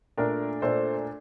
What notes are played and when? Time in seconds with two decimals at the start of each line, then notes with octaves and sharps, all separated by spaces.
0.17 A#2 A3 D4 A#4
0.62 A#2 A3 D4 A4 C5